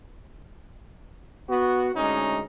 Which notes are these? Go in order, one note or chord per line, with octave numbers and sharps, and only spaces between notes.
B3 F#4
D2 G#3 C#4 D#4